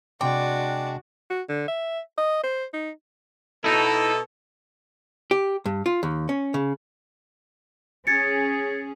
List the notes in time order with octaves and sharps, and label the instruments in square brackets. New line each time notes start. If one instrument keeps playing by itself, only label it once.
[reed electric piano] C3 C6 D6 [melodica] G#3 D4 [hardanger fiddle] F#4 D5 [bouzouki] G5
[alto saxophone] F#4
D3
E5
D#5
C5
D#4
[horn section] B2 A4 [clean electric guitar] D#4 E4
[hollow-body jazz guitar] G4
G2
F4
D#2
C#4
C#3
[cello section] C#4 G#4 [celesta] G#6 A6 C#7